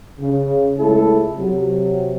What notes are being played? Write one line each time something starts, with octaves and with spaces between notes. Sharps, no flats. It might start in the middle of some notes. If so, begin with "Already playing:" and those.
C#3
C#2 C#3 A3 E4 A4
C3 F#3